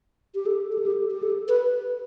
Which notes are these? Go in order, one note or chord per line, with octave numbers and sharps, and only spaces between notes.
G4
A4
G4
A4
G4
G4
A4
B4